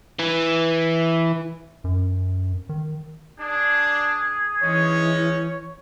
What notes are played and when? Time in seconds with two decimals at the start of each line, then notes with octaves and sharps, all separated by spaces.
0.19 E3
1.84 F#2
2.69 D#3
3.39 D4 G#4
4.62 E3 G#3 C#4 D#4 C#5